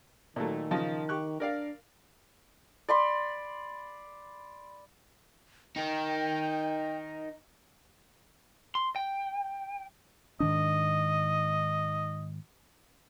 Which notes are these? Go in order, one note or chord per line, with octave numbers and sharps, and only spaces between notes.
A#2 D#3 F#3 A3
C#3 F3 D#5
G4 C#6 F#6
D4 A#4 D5 F5
D5 B5 C6
D#4 A#4 G5
C6
G5
G#2 D#3 D4 D#5